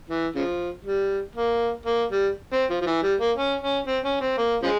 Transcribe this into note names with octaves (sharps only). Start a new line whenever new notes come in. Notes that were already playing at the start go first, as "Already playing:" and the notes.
E3
C#3 F3
G3
A#3
A#3
G3
C4
F3
F3
E3
G3
A#3
C#4
C#4
C4
C#4
C4
A#3
C#3 F3 G#3